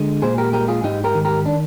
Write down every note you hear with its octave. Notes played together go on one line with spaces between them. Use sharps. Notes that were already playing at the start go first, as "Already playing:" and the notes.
Already playing: D3 G#3
A#2 G#4 C5
G4 A#4
G#3 G4 A#4
F4 G#4
G#2 D#4 G4
G4 A#4
D#3
G4 A#4
D4